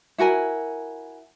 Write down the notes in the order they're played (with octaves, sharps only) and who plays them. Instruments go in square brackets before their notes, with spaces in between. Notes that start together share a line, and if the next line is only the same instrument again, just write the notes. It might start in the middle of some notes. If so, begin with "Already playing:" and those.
[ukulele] E4 F#4 A#4 G#5